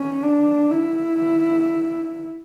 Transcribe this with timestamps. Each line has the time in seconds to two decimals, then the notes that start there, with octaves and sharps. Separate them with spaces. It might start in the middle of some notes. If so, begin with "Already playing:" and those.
Already playing: C#4
0.23 D4
0.71 E4